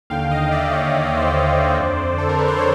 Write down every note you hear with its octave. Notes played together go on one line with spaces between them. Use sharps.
D#2 D3 F5 G5
D#5 F5
F5
D5 E5
C#5 D#5
D#2 D3 D5
D#5
C5 D5
F2 D3
A4
A#4
B4
C5
B4 C#5